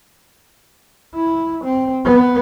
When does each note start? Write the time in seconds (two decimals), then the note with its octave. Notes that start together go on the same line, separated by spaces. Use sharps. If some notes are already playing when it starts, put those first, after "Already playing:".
1.14 E4
1.63 C4
2.05 B3